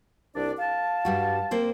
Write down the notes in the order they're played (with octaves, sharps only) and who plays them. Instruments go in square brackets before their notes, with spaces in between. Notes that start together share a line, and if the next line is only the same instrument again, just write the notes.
[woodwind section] C2 D4 D5
F5 A5
[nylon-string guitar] G2 G3 F#4
A#3 C4 C5